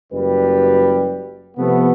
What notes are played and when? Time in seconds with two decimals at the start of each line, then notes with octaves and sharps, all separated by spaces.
0.12 F#1 F#2 G3 B4
1.57 C3 F3 A3 B3